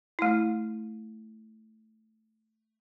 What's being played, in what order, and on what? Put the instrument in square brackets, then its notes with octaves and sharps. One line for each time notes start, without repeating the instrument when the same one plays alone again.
[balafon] A3 E4